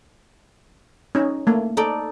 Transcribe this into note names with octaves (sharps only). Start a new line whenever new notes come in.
C#4 D#4
A3 A#3
D#4 A4 D5